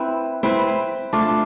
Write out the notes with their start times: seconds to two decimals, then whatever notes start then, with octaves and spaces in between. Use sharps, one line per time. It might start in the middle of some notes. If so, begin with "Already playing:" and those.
Already playing: C4 E4 B4
0.43 C4 E4 B4
1.13 A3 D4 F4